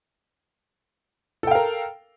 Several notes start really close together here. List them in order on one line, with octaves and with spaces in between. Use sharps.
A4 G5 F5 A#4